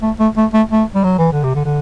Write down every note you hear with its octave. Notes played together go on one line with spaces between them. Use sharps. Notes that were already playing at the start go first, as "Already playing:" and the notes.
A3
A3
A3
A3
A3
G3
F#3
E3
D3
C3
D3
D3